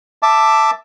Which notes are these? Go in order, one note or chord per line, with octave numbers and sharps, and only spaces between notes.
E5 A5 D6